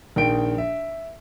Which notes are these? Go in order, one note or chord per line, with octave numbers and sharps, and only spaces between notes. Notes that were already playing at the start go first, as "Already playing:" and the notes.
A#1 D#3 G5 D7
E5